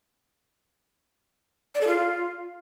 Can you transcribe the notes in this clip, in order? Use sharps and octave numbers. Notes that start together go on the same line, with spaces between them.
D5
A4
F4